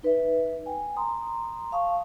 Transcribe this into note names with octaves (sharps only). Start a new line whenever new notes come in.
D#4 B4 D5 E5
G5 G#5
A#5 C6 D#6
F5 A5 C#6 D#6